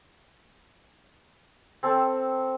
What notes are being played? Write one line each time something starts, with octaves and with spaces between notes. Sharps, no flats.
C4 A4 A5